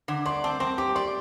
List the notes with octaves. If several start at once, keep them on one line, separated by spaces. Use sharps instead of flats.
D3 D6
D5 C6
C4 A5
C4 C6
G4 D6
D5 C6